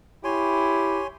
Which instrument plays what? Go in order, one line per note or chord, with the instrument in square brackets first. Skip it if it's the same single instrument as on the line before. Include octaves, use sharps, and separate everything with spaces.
[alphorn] E4 [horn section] G4 [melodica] C#5 G#5 C6